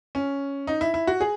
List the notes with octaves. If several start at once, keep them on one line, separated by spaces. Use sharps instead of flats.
C#4
D#4
E4
E4
F#4
G#4